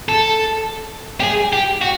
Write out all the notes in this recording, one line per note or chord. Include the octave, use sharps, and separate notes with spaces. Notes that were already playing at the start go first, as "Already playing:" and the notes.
A4
G4
G#4
G4
F#4